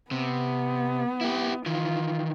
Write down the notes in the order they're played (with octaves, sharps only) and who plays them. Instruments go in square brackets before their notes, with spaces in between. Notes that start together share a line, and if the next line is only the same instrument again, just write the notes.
[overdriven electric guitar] C3 [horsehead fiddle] B3
[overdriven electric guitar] E4 G4
[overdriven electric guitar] D#3 E3 [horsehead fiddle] F4